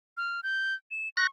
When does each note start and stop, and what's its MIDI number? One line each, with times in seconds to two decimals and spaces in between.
0.17 0.41 89
0.43 0.74 91
0.91 1.09 100
1.17 1.27 85
1.17 1.27 90
1.17 1.27 94